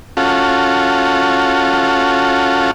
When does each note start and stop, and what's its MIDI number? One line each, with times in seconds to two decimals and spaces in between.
0.17 2.71 61
0.17 2.71 65
0.17 2.71 66
0.17 2.71 69